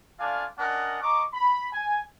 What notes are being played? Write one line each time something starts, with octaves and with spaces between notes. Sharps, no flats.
A3 D4 F4 D5 F5 G#5
C#4 D4 A#4 D#5 F#5
D#5 A#5 C#6 D6
B5
G#5